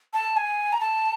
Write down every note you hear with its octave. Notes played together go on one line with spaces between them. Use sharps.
A5
G#5
A#5
A5